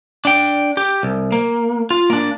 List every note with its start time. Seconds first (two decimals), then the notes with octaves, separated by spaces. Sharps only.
0.25 D4 G5
0.77 G4
1.03 C2
1.32 A#3
1.91 F4
2.10 A#3 D4